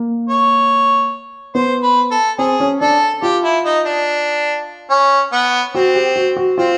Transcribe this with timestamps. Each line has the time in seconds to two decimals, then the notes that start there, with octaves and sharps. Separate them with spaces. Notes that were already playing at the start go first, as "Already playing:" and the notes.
Already playing: A#3
0.29 C#5
1.55 B3 C5
1.82 B4
2.11 A4
2.38 C4 G#4
2.60 C#4
2.81 D4 A4
3.22 F4 G4
3.44 E4
3.65 D#4
3.85 D4
4.90 C#4
5.32 B3
5.74 C4 F#4
5.95 G4
6.16 F#4
6.37 F#4
6.58 C4 F4